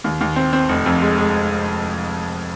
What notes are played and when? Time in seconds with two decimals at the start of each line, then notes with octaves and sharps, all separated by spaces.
0.04 D#2
0.21 D#2
0.36 C4
0.53 C4
0.69 F1
0.86 F2
1.02 G#3
1.18 G#3